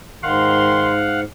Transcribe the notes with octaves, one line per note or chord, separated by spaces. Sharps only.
G#2 D#3 F5 F#5 C6